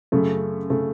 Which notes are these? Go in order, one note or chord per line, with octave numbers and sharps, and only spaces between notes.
F#2 C#3 A3
C#3 A3